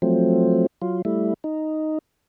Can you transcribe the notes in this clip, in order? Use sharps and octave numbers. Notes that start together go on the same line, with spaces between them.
F3 F#3 A3 C4
F#3 F4
G3 A3 E4
D#4